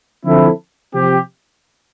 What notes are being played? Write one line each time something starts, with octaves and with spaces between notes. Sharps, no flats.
D3 F3 C4 E4 A4
C3 F3 C4 G4